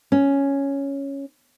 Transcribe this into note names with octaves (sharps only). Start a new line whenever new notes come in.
C#4